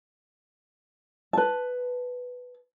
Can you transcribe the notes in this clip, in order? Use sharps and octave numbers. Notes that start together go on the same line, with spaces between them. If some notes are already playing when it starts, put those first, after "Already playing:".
B4 A5